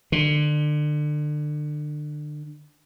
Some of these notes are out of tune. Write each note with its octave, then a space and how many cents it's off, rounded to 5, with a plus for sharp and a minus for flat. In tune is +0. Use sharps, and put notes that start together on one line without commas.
D3 +30